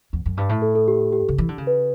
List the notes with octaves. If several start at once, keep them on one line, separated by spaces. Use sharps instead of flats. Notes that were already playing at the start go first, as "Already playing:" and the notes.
E2
F#2
G2
A2
A4
A4
G4
G4
C#3
E3
D3
C#3
B4